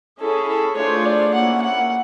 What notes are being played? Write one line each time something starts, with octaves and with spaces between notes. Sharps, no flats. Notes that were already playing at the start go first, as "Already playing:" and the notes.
C#4 E4 G#4 A4
A4
A3 D4 F4 G#4 C5 C#5
D5
A#3 C#4 E4 F#5
F#5